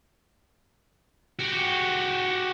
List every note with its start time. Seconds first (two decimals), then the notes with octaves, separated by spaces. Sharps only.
1.39 F#4 G4